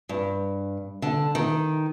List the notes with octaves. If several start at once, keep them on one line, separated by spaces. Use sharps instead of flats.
G2
D3
D#3